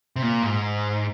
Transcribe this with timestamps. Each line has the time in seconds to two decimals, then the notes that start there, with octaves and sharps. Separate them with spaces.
0.16 C3
0.22 A#2
0.43 G#2